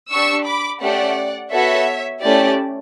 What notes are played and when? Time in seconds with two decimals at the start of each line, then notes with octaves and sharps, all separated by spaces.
0.11 D4 G4 C#6 E6
0.45 B5 D6
0.81 A3 C#4 G4 D5 F#5
1.51 B3 F#4 A4 C#5 E5
2.21 A3 C#4 E4 G4 D5